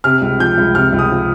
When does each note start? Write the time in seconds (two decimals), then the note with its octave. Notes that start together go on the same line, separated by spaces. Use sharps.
0.04 C3 F6
0.22 C#2
0.39 F3 G6
0.58 C#2
0.75 C3 F6
0.93 C#2
0.99 D#6
1.11 F3